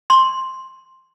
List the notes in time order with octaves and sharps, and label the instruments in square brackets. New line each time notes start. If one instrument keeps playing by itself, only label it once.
[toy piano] C6